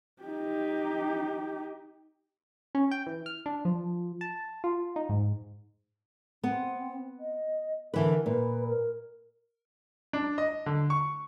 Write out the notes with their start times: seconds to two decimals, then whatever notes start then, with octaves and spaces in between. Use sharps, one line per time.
0.23 D#4 G4
2.75 C#4
2.91 G5
3.07 E3
3.26 F6
3.46 D4
3.65 F3
4.21 A5
4.64 F4
4.96 D#4
5.09 G#2
6.44 B3 C4
7.20 D#5
7.94 D3 E3 A#4 B4
8.26 A#2 B4
8.67 A#4
10.13 D4
10.38 D#5
10.66 D3
10.90 C#6